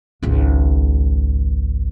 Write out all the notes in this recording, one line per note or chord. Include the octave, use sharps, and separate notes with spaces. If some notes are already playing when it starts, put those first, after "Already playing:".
G#1 C#2